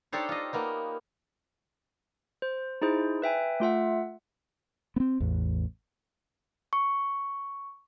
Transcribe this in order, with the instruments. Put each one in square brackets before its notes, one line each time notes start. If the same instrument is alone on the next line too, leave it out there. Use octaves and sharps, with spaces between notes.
[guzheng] D4 D#4 G4 A4 C5 C#5
F4 D#5
A#3 B3 D#4
[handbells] C5
D#4 E4 G#4 C5
B4 E5 G5 G#5
A3 F4 E5 F#5
[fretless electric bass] B3 C4
A1 E2
[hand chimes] C#6